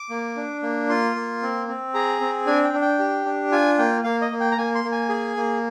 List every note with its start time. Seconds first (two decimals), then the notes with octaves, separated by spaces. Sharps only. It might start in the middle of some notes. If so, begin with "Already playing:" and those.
Already playing: D6
0.10 A#3
0.36 D4
0.63 A#3
0.89 F4 C6
1.16 A#3
1.42 C4
1.68 C4
1.94 G#4 A#5
2.21 C4
2.46 D4 G#5
2.64 G5
2.74 D4
2.81 G5
2.99 G4
3.25 D4
3.52 F4 G#5
3.78 A#3 G5
4.04 A#3 F5
4.22 D#5
4.31 A#3
4.40 G5
4.51 A#5
4.58 A#3 G#5
4.75 C6
4.84 A#3
4.92 G#5
5.09 G#4
5.37 A#3